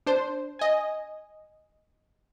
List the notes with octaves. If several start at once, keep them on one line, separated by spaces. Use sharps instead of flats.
D4 C5
D#5 G#5